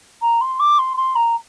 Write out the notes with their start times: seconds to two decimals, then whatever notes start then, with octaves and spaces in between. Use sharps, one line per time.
0.22 A#5
0.41 C6
0.59 D6
0.78 C6
0.97 C6
1.15 A#5